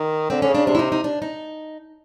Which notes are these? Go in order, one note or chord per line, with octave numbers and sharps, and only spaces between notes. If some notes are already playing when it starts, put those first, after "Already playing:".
Already playing: D#3
D3 C4
D3 C#4
C#3
D4
C3 D4
E4
D#4
D#4
D4
D#4